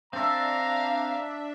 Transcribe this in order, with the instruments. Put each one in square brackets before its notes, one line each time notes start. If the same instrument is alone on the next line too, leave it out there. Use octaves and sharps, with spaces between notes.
[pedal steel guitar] C4 A4 E6 [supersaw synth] D4 E5 [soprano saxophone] F5 [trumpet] A#5